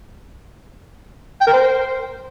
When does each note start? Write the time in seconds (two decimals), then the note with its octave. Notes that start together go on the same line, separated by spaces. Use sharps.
1.41 G5
1.47 A#4
1.53 C5